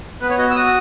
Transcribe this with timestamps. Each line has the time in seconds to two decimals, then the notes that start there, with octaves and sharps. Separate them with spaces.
0.21 B3 B4
0.30 C#5
0.38 F#4 D#5
0.50 E6
0.55 F#4 D#6